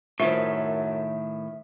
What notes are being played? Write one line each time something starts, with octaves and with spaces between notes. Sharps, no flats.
F#2 A2 D#3 F4 C5 E5